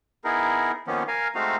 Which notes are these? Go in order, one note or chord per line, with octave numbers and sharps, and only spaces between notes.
B3 D#4 E4 G#4 A#4
D#3 F3 A#3 B3 C#4
A#4 F5 G#5
G#3 A3 C4 D#4 F#4 F5